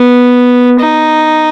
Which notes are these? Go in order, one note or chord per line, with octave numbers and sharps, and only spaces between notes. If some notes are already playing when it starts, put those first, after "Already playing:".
Already playing: B3
D#4